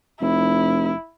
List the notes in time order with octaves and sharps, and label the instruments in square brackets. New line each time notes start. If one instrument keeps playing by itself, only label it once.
[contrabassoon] F1 [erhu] E4